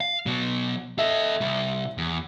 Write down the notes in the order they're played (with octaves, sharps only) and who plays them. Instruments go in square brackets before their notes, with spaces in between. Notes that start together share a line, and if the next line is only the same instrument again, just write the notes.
[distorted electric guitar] F5
[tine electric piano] B2 [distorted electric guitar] F#3 B3
[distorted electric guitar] A4 D#5 [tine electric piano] E5
[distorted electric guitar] C3 G3
E2